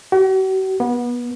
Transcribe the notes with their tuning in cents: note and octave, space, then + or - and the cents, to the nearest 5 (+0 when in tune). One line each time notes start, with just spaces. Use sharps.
F#4 +45
B3 -25